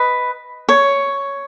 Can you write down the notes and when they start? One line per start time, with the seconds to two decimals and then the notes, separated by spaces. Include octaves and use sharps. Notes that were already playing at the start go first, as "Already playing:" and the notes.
Already playing: B4 D#5
0.69 C#5